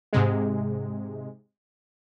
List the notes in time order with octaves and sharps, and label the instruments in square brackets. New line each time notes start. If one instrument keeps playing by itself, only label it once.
[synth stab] G#2 C3 G#3